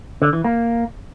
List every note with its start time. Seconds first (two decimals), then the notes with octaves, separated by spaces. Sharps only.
0.22 D3
0.33 E3
0.44 A#3